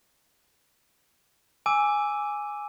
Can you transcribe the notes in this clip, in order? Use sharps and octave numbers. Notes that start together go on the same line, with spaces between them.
G#5 D6 E6 D#7